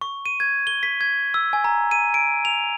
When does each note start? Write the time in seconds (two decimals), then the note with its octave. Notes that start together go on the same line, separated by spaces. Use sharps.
0.01 C#6
0.26 D#7
0.40 G#6
0.67 G7
0.83 B6
1.01 G#6
1.34 E6
1.53 G#5
1.64 A#5
1.91 D#7
2.14 D7
2.45 F7